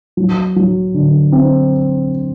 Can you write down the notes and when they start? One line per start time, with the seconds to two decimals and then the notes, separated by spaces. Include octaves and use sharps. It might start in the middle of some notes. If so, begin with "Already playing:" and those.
0.17 F#3
0.56 F#3
0.94 D3
1.32 C4